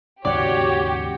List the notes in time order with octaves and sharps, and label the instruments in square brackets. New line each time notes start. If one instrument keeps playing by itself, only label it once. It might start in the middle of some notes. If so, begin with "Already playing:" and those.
[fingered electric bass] D#2 G#2 C#3 [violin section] F#4 G4 [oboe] C#5 [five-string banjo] D5 F#5